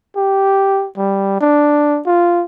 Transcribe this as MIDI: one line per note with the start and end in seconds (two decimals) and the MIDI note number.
0.16 0.87 67
0.97 1.39 55
1.41 2.01 62
2.06 2.45 65